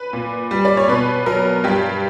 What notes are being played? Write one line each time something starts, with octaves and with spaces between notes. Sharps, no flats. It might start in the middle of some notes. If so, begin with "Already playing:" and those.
Already playing: B4
A#2
G3
D5
C#5
B2 B4
F#3 A#4
G2 G4